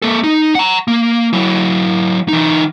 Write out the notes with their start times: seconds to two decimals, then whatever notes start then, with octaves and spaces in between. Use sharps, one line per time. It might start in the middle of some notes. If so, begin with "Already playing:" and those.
0.02 A#3 A4
0.24 D#4
0.55 F#5 A#5
0.88 A#3
1.33 F#3 E4
2.28 E3 D#4